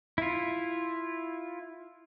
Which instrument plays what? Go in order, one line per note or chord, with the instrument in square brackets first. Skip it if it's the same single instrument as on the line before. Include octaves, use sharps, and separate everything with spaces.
[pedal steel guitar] E4 F4